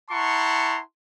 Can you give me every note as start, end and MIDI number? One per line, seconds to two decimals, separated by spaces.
0.11 0.80 64
0.11 0.80 78
0.11 0.80 81
0.11 0.80 82
0.11 0.80 84
0.11 0.80 85